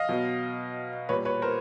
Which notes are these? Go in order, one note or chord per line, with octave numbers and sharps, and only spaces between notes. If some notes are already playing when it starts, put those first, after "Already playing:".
Already playing: D#5 F5
B2 F#3
A#2 G3 B4 C#5
B4 C#5
A#4 C5